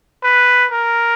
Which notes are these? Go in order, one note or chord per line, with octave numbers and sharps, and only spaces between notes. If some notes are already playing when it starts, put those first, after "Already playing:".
B4
A#4